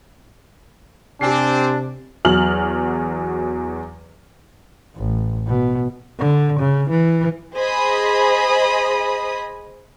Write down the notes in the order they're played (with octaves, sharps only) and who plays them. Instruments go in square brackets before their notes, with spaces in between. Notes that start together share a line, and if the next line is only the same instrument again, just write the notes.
[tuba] C3 [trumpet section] C4 [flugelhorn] D4 [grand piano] G4 G#5 C7
[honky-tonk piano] E2 F#3 F6 F#7
[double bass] A1
B2
D3
C#3
E3
[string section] G#4 C5 D#5 B5 D#6